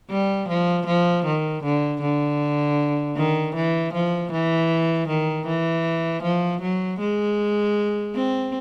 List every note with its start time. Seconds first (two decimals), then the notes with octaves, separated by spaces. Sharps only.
0.10 G3
0.48 F3
0.86 F3
1.25 D#3
1.63 D3
2.01 D3
3.17 D#3
3.55 E3
3.93 F3
4.32 E3
5.08 D#3
5.47 E3
6.23 F3
6.61 F#3
6.99 G#3
8.15 C4